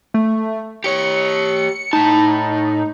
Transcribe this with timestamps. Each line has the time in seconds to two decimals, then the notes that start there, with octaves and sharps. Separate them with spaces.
0.14 A3
0.84 G4 C#5 C#7
1.93 A2 D#4 A5